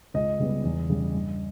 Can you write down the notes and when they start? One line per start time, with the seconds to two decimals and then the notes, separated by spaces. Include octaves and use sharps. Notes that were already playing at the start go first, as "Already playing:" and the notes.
0.14 C#2 D#5
0.40 C#3 G3 B3
0.64 E2
0.90 C#3 G3
1.14 G2